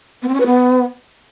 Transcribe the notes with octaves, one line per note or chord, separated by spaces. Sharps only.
B3
C4
C#4
B4
B3